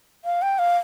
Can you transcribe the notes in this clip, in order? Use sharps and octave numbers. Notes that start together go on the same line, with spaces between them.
F5
G5
F5